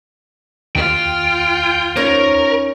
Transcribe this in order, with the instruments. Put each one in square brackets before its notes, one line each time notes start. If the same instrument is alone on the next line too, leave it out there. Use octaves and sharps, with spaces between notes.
[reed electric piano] D#2 [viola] F4 [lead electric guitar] G5
[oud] C#4 D#4 C#5 [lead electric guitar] A#4